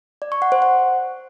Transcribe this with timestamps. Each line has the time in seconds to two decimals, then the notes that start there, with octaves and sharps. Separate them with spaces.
0.22 D5
0.32 C#6
0.42 F#5
0.52 C5
0.62 F#5